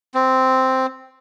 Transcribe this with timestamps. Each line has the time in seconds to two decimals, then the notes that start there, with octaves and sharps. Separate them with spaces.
0.15 C4